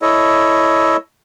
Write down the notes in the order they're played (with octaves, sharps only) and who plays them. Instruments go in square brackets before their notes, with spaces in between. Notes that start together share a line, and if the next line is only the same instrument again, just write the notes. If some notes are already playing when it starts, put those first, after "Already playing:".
[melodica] E4 A4 C#5 D#5